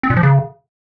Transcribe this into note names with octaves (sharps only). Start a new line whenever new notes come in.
C4
A#2
F3
C#3